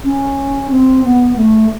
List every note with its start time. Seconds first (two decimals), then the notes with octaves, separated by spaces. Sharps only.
0.04 C#4
0.71 C4
1.04 B3
1.36 A3